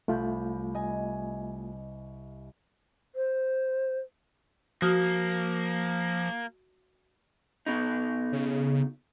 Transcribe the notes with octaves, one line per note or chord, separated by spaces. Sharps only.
C2 A3 F4 B5 G6
D#5 G#5
C5
F3 A#3 F#4 D#6 F6
B2 D#4
C#3